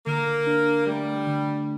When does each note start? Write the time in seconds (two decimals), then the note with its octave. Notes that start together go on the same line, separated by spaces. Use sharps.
0.06 D3 A#3
0.47 D4
0.86 G3 A3
1.26 D3